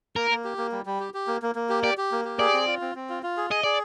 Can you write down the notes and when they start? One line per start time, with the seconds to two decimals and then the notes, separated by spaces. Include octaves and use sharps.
0.16 A#3 A#4
0.31 A#3
0.44 G4
0.58 A#3
0.72 G3
0.86 G3
1.00 G4
1.14 G4
1.27 A#3
1.42 A#3
1.55 A#3
1.69 G4
1.84 G4 D5
1.97 G4
2.12 A#3
2.25 G4
2.39 G#4 D5
2.53 C4
2.67 F4
2.81 C4
2.95 C4
3.09 F4
3.23 F4
3.37 G#4
3.50 G#4 D#5
3.64 G#4 D5